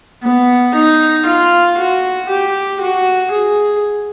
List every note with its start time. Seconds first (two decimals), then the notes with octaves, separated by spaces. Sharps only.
0.23 B3
0.74 D#4
1.26 F4
1.78 F#4
2.29 G4
2.81 F#4
3.32 G#4